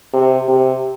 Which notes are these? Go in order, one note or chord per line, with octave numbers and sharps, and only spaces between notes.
C3
C3